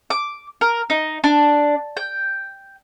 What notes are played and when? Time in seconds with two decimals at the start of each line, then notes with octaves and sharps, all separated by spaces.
0.10 D6
0.61 A#4
0.90 D#4
1.24 D4
1.97 G5